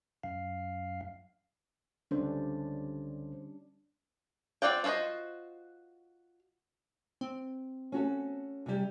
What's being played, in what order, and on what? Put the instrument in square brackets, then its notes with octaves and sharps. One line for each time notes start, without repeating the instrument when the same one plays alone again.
[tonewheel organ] F#2 F5
[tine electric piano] C#2 D3 C5 [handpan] G3 C#4 D4
[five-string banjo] C4 F4 D5 F#5 G5
F4 F#4 A#4 C5 D#5
[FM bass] C4
[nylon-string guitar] C#4 F#4 A4
C3 G3